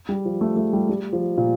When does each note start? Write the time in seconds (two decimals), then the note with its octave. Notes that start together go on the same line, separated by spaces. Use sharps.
0.09 G3
0.25 F3
0.41 A3
0.56 A3
0.73 G3
0.89 G3
1.13 F3
1.37 A#2